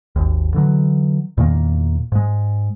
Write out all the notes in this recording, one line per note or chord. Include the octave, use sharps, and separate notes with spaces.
G#1 D#2
D3 E3 F#3
E2 A#2 D#3 A#3
G#2 G#3